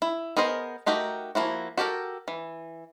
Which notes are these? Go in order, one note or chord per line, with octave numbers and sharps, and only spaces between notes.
E4
B3 G#4 A#4 C5 D#5
A3 D#4 F#4 G4 A#4
F3 A#3 E4 F#4
F#4 G4 A4 A#4
E3